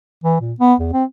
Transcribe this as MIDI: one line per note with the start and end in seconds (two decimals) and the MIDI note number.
0.24 0.37 52
0.41 0.53 46
0.60 0.74 59
0.80 0.91 40
0.93 1.04 60